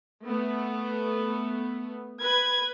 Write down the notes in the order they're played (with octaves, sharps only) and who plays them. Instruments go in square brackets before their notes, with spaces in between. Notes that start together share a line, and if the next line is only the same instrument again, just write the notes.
[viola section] A3 B3
[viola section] B4 [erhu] G#6